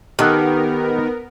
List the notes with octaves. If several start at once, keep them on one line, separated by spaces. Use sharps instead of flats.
D#3 B3 G4 A4 A#4 D#5 F#5